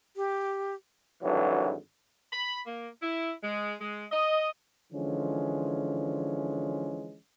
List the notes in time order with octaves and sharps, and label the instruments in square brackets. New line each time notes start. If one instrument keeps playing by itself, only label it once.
[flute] G4
[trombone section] G#1 G2 D3 E3 F#3
[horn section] B5
A#3
E4
G#3
G#3
D#5
[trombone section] D3 E3 F3 G#3 C#4